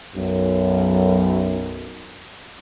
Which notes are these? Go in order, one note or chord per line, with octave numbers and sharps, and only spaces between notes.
B1 F#2